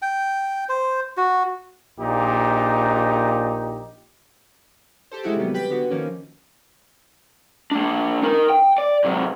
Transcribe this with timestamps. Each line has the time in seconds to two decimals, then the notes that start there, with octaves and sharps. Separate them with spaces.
0.02 G5
0.69 C5
1.17 F#4
2.00 A#1 A#2 D#4 G4
5.11 G4 A4 C5
5.23 G#3 A3 E4 F#4 G4
5.36 C3 D#3 F#3 G3 B3
5.54 G4 B4 G5 B5 A6 B6
5.70 D3 B3 F#4
5.90 D#3 F3 A#3 C#4
7.71 A#3 D4
8.23 D#4 A#4
8.50 G5
8.78 D5
9.04 C3 F#3